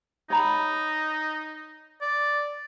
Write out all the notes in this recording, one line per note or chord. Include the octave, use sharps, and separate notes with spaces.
D#4 C#5 A#5 B5
D5